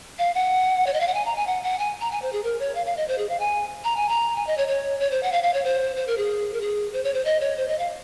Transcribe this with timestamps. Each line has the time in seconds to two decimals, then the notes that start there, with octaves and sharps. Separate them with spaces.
0.19 F5
0.35 F#5
0.87 C#5
0.94 D#5
1.00 F5
1.08 F#5
1.14 G#5
1.25 A#5
1.36 G#5
1.47 F#5
1.63 F#5
1.79 G#5
2.01 A#5
2.11 G#5
2.22 C5
2.33 G#4
2.44 A#4
2.59 C#5
2.75 F5
2.86 F5
2.97 D#5
3.08 C5
3.18 G#4
3.29 F5
3.40 G#5
3.84 A#5
3.97 G#5
4.09 A#5
4.36 G#5
4.47 D#5
4.57 C#5
4.68 C#5
5.00 C#5
5.11 C5
5.23 F#5
5.32 F5
5.43 F5
5.54 C#5
5.64 C5
5.96 C5
6.07 A#4
6.18 G#4
6.54 A#4
6.61 G#4
6.93 C5
7.04 C#5
7.14 C5
7.25 D#5
7.41 C#5
7.57 C5
7.68 D#5
7.79 F5